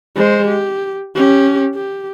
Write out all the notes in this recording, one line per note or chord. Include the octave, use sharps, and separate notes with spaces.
G#3 C5
G4
C#4 G4
G4